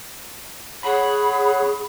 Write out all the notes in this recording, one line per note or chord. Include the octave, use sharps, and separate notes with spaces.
G#4 C#5 F#5 B5